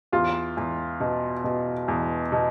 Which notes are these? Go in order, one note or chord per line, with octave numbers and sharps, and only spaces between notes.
E2 F4
E2
B2
B2
E2
B2